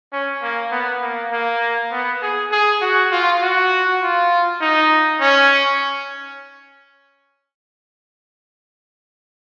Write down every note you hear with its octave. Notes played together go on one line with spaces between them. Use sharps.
C#4
A#3
B3
A#3
A#3
B3
G#4
G#4
F#4
F4
F#4
F4
D#4
C#4